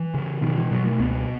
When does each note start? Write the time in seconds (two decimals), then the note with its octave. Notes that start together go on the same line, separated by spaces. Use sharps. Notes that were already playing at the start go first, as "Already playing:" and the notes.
Already playing: E3
0.14 C#3
0.42 B2 D#3
0.57 E3
0.71 B2 F#3
0.85 A3
0.99 C#2 B3